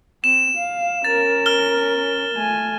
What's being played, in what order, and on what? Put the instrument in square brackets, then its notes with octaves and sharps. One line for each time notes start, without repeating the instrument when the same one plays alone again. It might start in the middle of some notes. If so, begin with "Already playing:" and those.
[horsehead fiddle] C4 [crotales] E7
[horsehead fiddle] F5
[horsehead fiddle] C#4 A#4 [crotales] A6
[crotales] F6 G7
[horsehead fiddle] A3 G#5